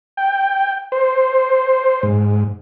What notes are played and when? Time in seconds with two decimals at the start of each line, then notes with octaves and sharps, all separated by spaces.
0.17 G5
0.92 C5
2.03 G#2